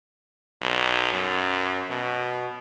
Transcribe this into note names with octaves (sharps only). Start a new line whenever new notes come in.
B1
F#2
B2